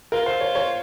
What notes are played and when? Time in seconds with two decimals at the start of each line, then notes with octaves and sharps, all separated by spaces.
0.12 F4 A#4
0.26 C5
0.41 C#5
0.55 C#5